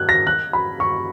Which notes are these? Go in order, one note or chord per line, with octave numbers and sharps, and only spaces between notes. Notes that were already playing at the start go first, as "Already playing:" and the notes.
Already playing: F#6 G#6
A#6
F#6
B5
C#6